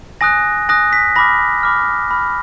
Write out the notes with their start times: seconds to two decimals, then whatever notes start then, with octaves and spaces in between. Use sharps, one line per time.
0.21 G#5 D#6 F#6 A#6
0.69 G#5 D#6 F#6 A#6
0.93 B6
1.16 B5 D6 F6 A#6
1.63 B5 D6 F6
2.11 B5 D6 F6